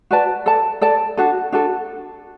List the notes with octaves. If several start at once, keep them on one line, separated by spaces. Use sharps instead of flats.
F#4 B4 D5 A5
A4 D5 A5
A4 D5 A5
D4 F#4 A4
D4 F#4 A4